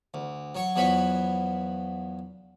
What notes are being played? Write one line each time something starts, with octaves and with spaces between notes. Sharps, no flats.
D2
F#3 C#5 C#6
E2 F3 F#3 B4 B5 C#6